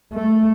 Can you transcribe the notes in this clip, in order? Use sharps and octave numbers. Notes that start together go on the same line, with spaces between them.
A3